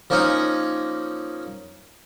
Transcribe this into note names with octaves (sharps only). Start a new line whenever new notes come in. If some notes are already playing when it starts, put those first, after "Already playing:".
F3 A#3 C#4 D#4 C#5